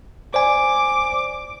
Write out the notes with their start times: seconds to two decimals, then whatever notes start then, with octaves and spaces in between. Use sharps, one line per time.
0.34 C5 D5 G#5 D6